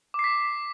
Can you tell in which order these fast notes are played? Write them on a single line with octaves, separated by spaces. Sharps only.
D6 C7 B6